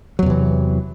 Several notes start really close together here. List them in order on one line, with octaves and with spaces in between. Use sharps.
F#3 E2 C3 E3